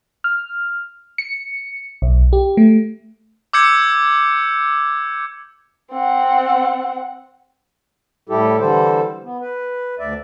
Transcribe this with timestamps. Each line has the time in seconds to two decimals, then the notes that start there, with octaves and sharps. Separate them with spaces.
0.24 F6
1.18 C#7
2.02 B1
2.33 G4
2.57 A3
3.53 D6 E6 G6 G#6 C#7
5.91 C4 F#5
8.29 A2 G3 E4 G4 A4
8.60 D3 E3 G3 A4 C5
9.24 B3
9.41 B4
9.99 D2 D5 E5